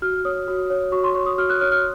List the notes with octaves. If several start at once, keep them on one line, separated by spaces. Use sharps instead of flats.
F#4 F6
C#5 D#6
F#4
C#5
F#4 C#6
C6
C#5 C#6
D#6
F#4 F6
F#6
C#5 F6
F6